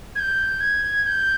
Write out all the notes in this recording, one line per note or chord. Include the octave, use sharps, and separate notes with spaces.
G#6
G6
G#6
G6